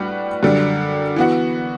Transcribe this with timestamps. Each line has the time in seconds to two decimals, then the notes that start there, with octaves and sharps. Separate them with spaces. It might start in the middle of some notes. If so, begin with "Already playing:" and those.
Already playing: A2 G3 D4 F#4 B4
0.43 F#2 D3 G3 D4
1.16 E3 B3 F#4